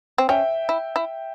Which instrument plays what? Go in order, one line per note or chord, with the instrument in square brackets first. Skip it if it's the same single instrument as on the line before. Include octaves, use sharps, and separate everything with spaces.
[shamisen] C4
[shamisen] C#4 [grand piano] E5 G5
[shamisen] E4
E4